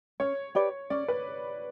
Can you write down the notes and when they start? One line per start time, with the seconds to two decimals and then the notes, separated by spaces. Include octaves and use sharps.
0.20 C#4 C#5
0.55 G4 B4 D5
0.90 C#4 D5
1.08 B4